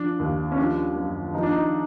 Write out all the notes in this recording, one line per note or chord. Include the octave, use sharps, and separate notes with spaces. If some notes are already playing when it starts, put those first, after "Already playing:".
Already playing: F3 D4
D#2
C#4
F3 D4
F#2
F3 D#4
D4
D#4